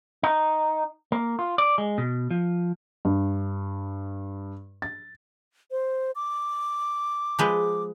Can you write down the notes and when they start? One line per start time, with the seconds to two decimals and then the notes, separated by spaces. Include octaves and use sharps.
0.23 D#4
1.12 A#3
1.39 F4
1.58 D5
1.78 G#3
1.98 B2
2.31 F3
3.05 G2
4.82 A6
5.71 C5
6.15 D6
7.39 F3 G#3 B4